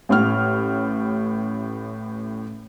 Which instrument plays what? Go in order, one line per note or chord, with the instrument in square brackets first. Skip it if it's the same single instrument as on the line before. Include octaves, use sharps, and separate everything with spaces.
[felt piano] A1 A2 F6